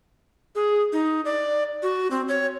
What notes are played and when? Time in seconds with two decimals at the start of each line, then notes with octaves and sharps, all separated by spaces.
0.55 G#4
0.93 D#4
1.25 D5
1.83 F#4
2.11 C4
2.28 C#5